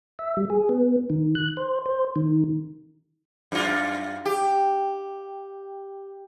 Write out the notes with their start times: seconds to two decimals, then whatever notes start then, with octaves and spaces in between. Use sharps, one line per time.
0.19 E5
0.37 G3
0.50 G#4
0.69 B3
1.10 D#3
1.35 F#6
1.57 C5
1.86 C5
2.16 D#3
3.52 F#2 F4
4.25 G4